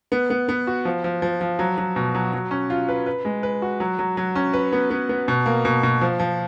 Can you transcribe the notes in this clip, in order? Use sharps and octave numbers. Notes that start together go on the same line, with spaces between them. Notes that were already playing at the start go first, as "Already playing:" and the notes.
B3
B3
B3
F#4
F3
F3
F3
F3
F#3
F#3
B2
F#3
F#3
C#4
F4
B4
B4
G#3
B4
F#4
F#3
F#3
F#3
C#4
B4
B3
B3
B3
B2
A#3
B2
B2
F3
F3